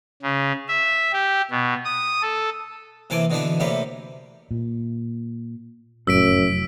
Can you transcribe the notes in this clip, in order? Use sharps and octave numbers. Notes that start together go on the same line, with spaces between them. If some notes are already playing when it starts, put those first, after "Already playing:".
C#3
E5
G4
B2
D#6
A4
C3 E3 A#3 G#5 A5 D6
B2 D3 E3 B3 D4
A2 C3 G3 A#3 B4
A#2
F1 F#2 A2 F#3 E6 B6 D7